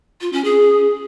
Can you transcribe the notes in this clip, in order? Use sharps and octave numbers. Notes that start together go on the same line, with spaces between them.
F4
C#4
G#4